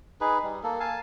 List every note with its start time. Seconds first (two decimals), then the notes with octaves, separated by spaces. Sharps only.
0.21 D#4 G#4 B4
0.43 G3
0.63 A#3 A4
0.80 F5 G#5 A5